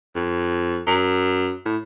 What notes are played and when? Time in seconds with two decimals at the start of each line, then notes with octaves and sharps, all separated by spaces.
0.16 F2
0.87 F#2
1.65 A2